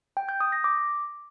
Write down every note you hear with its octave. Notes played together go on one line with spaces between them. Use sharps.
G5
G6
D#6
A#6
D6